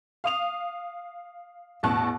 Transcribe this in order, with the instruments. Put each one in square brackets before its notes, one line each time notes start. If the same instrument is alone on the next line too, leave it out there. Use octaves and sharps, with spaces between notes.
[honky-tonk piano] F5 D#6 F7
A1 E2 B2 A5 C#6 F#6